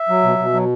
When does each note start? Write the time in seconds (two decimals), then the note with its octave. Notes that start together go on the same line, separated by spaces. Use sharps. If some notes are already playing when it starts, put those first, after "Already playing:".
Already playing: E5
0.09 F#3
0.23 B2
0.39 B2
0.53 F#3